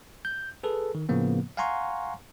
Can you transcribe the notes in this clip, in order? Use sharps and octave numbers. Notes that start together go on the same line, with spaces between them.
G6
G#4 A4 B4
D#3
A2 C#3 F3 A#3 B3
F5 F#5 G#5 A#5 C6 C#6